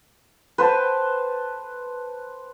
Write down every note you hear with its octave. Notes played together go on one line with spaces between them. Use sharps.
B4 C5 G5 A5